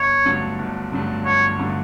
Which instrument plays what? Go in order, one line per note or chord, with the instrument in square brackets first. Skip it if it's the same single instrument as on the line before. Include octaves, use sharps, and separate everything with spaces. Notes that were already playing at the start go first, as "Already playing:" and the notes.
Already playing: [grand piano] G1 [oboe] C#5
[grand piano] G2 D3 F#3 A3
G1
G2 D3 F#3 A3
[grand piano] G1 [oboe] C#5
[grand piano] G2 D3 F#3 A3